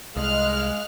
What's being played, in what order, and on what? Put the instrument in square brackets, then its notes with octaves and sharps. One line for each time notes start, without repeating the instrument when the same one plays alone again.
[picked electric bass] C2 [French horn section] G#3 [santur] D#5 [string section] F5 F6 F#6